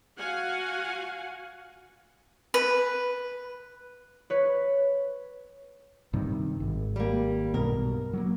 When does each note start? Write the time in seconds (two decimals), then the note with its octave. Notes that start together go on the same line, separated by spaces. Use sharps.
0.18 F#4 F5 F#5 G#5
2.54 B4
4.30 B4 C#5
6.13 G2 C3 D#3
6.60 G#1
6.96 G3 A#3
7.54 B1 G2 B2 A#4
8.13 F#3 G3 A#3